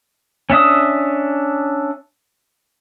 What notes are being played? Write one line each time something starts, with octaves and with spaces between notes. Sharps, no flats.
C#4 D4 E5 D#6